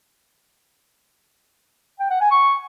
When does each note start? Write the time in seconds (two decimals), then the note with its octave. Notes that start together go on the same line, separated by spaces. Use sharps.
1.99 G5
2.10 F#5
2.21 G#5
2.31 C#6